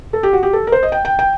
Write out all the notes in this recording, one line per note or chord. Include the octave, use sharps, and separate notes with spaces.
A4
G4
F#4
G4
A4
A#4
C5
D#5
G5
G5
G5